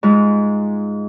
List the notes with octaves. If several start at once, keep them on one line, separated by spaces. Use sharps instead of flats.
G#2 G#3 F4